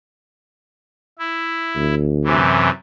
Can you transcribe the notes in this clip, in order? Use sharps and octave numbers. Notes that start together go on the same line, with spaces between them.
E4
D2
F#2 C3 E3